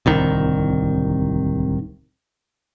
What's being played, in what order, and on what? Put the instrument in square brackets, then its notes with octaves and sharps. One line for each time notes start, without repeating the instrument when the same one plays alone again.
[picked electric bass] D1 C2 D#3